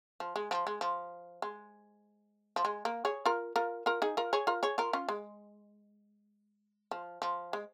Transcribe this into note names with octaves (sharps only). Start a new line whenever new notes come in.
F3
G#3
F3
G#3
F3
G#3
F3
G#3
A#3
G#4 C#5
F4 A#4
F4 A#4
F4 A#4
D#4 G#4
F4 A#4
G#4 C#5
F4 A#4
G#4 C#5
F4 A#4
C#4 F4
G#3
F3
F3
G#3